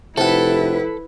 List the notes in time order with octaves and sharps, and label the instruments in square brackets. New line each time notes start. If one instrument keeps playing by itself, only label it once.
[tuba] F1 [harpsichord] C3 F#5 [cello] E4 B4 [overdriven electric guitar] A4